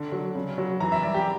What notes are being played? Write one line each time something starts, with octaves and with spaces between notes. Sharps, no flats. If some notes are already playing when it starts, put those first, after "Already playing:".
Already playing: D3
F#3
C#3
F#3
E3 A#5
E5
G3 D5
G4